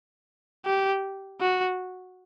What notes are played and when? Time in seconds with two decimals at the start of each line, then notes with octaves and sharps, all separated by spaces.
0.66 G4
1.41 F#4